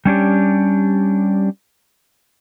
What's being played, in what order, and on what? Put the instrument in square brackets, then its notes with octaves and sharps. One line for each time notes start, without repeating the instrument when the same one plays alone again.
[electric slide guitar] G3 C#4 D4 G4